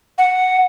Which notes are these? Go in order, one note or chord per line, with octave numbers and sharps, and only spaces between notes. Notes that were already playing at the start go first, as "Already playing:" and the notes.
F#5